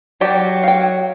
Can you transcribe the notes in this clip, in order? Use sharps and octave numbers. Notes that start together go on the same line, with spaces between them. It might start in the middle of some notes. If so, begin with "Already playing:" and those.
F#3 G4 D5 G5
F5 G5